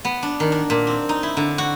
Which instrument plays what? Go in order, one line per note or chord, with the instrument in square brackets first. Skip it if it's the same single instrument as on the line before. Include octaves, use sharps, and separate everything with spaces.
[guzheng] B3
D4
D#3
D4
A#2
C4
D#4
E4
D3
F#4